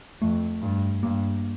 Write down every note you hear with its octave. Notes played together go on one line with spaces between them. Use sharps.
F2 A3
G2
G2 A#3